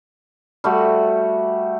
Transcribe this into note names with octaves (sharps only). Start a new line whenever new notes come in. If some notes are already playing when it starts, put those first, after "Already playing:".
G3 A3 F#4